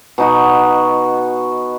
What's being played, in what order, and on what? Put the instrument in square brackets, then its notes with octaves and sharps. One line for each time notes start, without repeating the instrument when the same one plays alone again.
[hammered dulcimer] B2 D#4 F#4